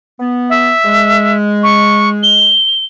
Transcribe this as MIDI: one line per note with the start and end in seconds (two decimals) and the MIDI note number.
0.19 0.71 59
0.50 1.36 76
0.84 2.55 56
1.63 2.10 85
2.23 2.84 103